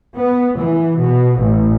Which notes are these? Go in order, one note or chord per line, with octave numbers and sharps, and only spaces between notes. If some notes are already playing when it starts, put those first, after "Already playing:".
B3
E3
B2
A1